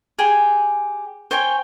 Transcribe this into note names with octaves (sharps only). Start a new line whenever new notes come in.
G4 G#4 G#5
C5 C#5 G5 G#5